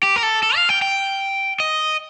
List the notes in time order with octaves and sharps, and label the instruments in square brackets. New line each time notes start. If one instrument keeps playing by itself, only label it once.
[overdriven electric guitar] G4
A#4
A4
A4
F5
G5
G5
D#5